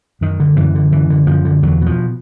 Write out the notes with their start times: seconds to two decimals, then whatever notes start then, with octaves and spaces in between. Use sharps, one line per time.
0.21 F#2 D#3
0.40 D3
0.57 F#2 E3
0.75 D3
0.92 F#2 E3
1.10 D3
1.27 F#2 F3
1.45 D3
1.63 E2 F#3
1.81 B2
1.86 F3